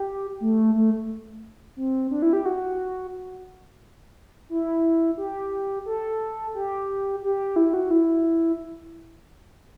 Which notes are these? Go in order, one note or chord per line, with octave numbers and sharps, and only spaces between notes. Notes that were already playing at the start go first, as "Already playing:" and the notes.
Already playing: G4
A3
A3
C4
D4
E4
G4
F#4
E4
G4
A4
G4
G4
E4
F#4
E4